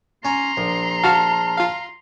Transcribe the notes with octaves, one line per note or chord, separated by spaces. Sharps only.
C#4 A#5 C6
A#1
F#4 F5 A5 F6
F4 F5